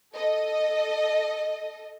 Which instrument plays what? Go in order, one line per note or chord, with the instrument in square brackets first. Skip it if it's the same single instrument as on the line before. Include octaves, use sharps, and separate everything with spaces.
[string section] A4 D#5